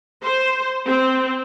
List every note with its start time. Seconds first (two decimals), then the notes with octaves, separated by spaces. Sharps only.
0.23 C5
0.86 C4